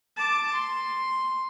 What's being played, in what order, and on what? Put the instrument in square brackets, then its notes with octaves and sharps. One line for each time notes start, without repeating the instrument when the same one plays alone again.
[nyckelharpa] A5 D6
C6